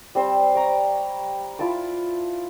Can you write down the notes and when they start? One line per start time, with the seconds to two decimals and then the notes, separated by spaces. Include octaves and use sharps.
0.15 G3 C4 C5 E6
0.55 A#5 C#6 D6
1.59 E4 F4 A5 D6